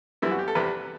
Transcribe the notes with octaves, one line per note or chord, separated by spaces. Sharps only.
F#2 E3 G3 E4
F#4
G4
A4
E2 C3 G3 B4